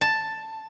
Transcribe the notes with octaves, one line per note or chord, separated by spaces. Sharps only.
A5